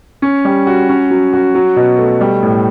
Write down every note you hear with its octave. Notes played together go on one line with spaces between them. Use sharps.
C#4
G3
F#4
C#4
F#3
F#4
F#3
B2
A3
G3
A2